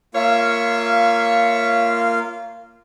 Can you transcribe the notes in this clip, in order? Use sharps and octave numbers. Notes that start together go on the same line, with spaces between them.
A#3 F4 C#5 E5 F5